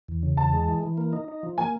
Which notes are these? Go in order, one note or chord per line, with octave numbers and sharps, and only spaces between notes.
E2
C#3
E2 A5
G#3
E3
E3
A#3
D#4
D#4
F3
A#3 G#5